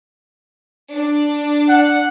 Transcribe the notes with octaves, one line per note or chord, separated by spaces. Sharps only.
D4
F#5